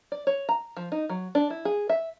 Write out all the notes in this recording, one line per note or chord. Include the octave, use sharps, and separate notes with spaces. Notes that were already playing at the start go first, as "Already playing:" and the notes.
D5
C#5
A#5
F3
D#4
F#3
D4
E4
G#4
E5